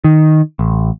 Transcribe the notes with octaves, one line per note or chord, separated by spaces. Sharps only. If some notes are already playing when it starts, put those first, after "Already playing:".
D#3
A1